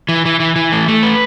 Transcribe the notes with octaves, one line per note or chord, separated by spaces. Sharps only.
E3
E3
E3
E3
A3
A3
B4